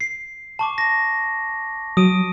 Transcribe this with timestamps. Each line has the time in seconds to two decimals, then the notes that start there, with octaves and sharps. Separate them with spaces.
0.01 C7
0.59 A5 C#6 D6
0.78 A#6
1.97 F#3 D#6 D7 D#7